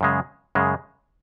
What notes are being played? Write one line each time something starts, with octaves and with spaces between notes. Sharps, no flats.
F#2 C#3 G#3
F#2 C#3 G#3